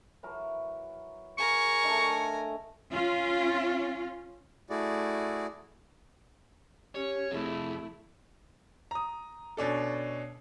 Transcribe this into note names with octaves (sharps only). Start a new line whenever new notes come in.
E3 F#3 A#4
C#3 A#4 G#5 C#6
A3 D4 D#4
C#4 F4
A3 E4 F#4 G#4 D5
C#4 G4 C#5
F2 C3 A3 E4 G#4
A#5 D#6
B2 C#4 D4 A4